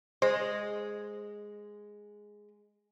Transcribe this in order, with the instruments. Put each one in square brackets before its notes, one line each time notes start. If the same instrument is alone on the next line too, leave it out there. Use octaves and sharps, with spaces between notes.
[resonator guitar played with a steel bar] G#3 [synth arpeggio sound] C5